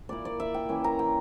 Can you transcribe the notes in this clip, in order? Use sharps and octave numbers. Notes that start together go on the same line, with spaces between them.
A#2 A#3 E4 D5
D5
E5
G5
E3 A#3 C#4 E4
A#5
G5